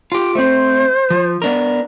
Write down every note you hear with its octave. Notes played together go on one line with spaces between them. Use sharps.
F4 G4
A3 C4 C5
F3
B3 D4 A#4